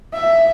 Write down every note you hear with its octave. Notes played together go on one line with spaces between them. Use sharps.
E5